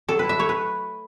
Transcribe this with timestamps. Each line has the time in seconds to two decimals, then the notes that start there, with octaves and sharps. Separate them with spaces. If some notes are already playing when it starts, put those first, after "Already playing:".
0.09 F#3 A4
0.19 B4
0.24 E4
0.29 E5
0.39 A3 C#5
0.49 B4